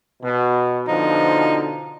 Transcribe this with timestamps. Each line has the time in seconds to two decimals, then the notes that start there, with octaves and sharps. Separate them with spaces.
0.23 B2
0.88 B2 D3 F3 D#4